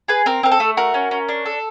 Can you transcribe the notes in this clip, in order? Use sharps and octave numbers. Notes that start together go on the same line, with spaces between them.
G#4 B4
C4 A#4
C4 A#4
A4
A3
F#4 A#4
C#4
C#4
D4
A4